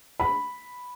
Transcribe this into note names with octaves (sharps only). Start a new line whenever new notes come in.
B5